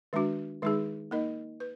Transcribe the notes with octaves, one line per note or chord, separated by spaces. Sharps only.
D#3 G#3 D4 F#4
D#3 G#3 D#4 G#4
A#3 D#4 A#4 D#5
B4